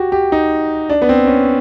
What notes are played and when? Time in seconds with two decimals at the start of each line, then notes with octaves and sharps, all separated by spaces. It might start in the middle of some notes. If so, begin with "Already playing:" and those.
Already playing: F#4 G4
0.12 G4
0.32 D#4
0.90 D4
1.02 B3
1.09 C4
1.27 C#4